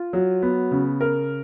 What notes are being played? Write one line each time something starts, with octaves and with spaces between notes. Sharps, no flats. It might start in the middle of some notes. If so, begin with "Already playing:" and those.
Already playing: F4
F#3
B3
C#3
A#4